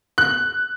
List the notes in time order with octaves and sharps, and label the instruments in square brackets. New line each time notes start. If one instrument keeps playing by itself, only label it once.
[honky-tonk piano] F#6